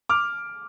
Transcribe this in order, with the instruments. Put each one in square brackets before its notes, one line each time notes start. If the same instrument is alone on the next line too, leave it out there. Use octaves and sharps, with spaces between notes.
[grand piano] D6 F6